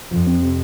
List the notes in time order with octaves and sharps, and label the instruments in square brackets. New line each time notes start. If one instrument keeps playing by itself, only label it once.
[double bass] F2 [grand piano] F3
[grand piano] C4
C3